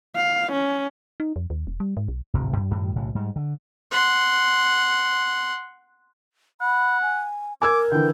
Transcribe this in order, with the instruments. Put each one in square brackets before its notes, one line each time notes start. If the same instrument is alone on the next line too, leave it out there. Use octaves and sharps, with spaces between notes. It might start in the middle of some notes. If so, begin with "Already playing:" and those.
[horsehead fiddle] F5
C#4
[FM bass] D#4
F2
D#2
E1
G3
G#2
B1
[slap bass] D1 G#1 D2 C3
F#2
F#2 A2 D#3 G3
B1 A2 C#3
G#2 G3
D3
[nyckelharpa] F#5 C6
[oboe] F#5 [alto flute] B5
[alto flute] G#5
[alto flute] A#4 [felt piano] G#5 E6 G#6 [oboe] D6
[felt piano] D3 E3 [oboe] G5